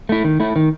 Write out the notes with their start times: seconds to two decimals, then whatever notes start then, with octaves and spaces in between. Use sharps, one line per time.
0.09 A3 E4
0.24 D#3
0.40 A3 E4
0.56 D#3